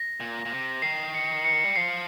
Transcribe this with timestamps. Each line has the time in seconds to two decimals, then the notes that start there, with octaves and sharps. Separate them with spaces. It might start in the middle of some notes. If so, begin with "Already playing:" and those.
Already playing: A#6
0.20 A#2
0.45 A#2
0.52 C3
0.82 D#3 C7
1.14 C#7
1.44 C#7
1.64 G3
1.76 F3 C7